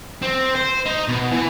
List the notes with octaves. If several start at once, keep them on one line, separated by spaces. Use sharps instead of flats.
C4
C5
D#4
B2
E3